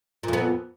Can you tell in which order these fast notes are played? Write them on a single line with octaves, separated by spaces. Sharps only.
A#2 F2 B3